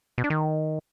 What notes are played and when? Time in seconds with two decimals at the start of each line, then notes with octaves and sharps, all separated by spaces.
0.18 B2
0.24 D4
0.30 D#3